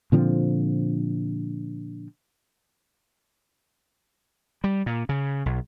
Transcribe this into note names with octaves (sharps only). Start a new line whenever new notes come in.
A#2 D3 F3 C4
G3
A#2
C#3
B1